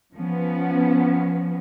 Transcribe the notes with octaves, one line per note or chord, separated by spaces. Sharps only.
F3 B3 C#4